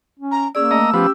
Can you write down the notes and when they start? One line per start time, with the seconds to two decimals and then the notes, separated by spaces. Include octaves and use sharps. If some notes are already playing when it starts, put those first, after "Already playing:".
0.20 C#4
0.31 A#5
0.55 A#3 C#4 G#4 D5 E6
0.71 A3 D#5 A#5
0.94 F3 B3 C#4 G4